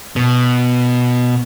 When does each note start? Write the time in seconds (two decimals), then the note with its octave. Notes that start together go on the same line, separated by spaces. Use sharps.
0.16 B2